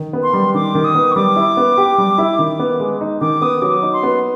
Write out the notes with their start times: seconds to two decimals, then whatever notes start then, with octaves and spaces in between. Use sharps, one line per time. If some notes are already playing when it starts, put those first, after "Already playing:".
Already playing: D#3
0.13 B3
0.23 C6
0.33 G3
0.54 D#3 D6
0.75 D#3
0.84 D#6
0.95 B3
1.12 C#6
1.16 G3 D6
1.36 E4
1.57 B3
1.77 G4
1.98 G3
2.18 E4
2.39 D#3
2.59 B3
2.80 G#3
3.01 D#4
3.21 D#3 D6
3.42 B3 D#6
3.62 F#3 D6
3.83 D#4
3.93 C6
4.03 B3